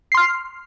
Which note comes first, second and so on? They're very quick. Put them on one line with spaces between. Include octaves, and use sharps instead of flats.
C7 C6 F6